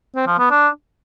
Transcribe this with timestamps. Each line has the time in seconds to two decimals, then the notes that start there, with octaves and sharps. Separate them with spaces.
0.15 C4
0.27 F3
0.39 B3
0.50 D4